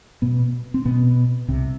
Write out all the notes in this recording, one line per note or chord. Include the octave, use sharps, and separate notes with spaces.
B2 B3
C4
B2 B3
C2 C3